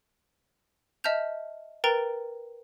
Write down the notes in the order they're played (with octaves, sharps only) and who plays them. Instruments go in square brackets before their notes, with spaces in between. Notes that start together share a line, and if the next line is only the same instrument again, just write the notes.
[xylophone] D#5 E5 A5 F6 G6 F7
A#4 B4 G5 A#5 A6 D7